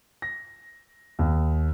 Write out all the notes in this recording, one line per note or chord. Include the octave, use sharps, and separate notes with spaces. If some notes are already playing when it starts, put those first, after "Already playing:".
A#6
D#2